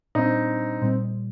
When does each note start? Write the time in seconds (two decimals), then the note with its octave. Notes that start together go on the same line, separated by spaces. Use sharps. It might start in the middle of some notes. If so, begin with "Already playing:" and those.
0.15 A#2 G3 C4 D4 D#4
0.82 A#2 G3 C4